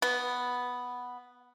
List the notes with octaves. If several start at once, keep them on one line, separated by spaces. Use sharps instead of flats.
B3